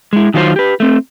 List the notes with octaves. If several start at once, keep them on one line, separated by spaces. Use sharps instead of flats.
G#3 E4
D#3 F#3 F4 G4 C5
G4 B4
A3 C4